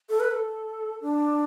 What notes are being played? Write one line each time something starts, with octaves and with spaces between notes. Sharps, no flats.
A4
B4
A4
D4